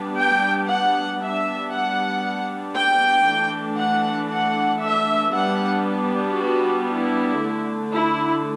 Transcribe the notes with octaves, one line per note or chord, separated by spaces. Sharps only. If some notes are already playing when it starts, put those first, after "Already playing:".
Already playing: G3 B3 D4
G5
F#5
G3 B3 D4 E5
F#5
G5
E3 A3 D4
F#5
F#5
E5
G3 B3 D4 F#5
F#4
E4
D3 A3 D4
E4